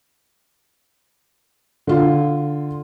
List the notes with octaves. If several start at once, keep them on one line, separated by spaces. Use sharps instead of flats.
D3 F4